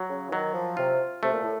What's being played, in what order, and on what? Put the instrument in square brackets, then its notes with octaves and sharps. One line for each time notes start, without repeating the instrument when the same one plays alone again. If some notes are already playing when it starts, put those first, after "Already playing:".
Already playing: [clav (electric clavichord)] F#3
[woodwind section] C#3
[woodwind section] D#3 [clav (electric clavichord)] F#3
[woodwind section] F3
[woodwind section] C3 [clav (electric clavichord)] F4
[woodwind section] C3 [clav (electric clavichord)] A3
[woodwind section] A#2
A2